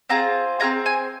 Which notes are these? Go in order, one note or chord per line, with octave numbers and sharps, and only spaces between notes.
C4 F4 G#4 A#5
C4 F4 G#4 A#5
G#5